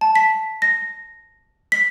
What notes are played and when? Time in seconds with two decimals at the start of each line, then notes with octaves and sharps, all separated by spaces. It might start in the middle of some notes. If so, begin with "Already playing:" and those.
0.01 A5
0.15 B6
0.62 A#6
1.72 B6